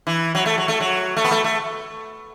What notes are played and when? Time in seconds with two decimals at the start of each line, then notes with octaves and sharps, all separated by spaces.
0.07 E3
0.35 F#3
0.46 A3
0.58 F#3
0.68 A3
0.80 F#3
1.17 A3
1.24 B3
1.31 A3
1.44 A3